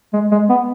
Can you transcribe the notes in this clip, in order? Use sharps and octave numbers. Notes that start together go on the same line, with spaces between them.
G#3
G#3
B3